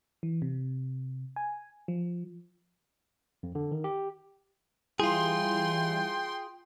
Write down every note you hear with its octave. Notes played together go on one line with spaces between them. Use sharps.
E3
C3
G#5
F3
F2
D3
D#3
G4
E3 G3 E4 F4 G#4 G5 C6